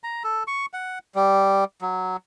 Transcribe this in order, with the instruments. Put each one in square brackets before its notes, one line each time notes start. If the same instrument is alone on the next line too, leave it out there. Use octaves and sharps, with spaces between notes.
[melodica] A#5
A4
C#6
F#5
G3
F#3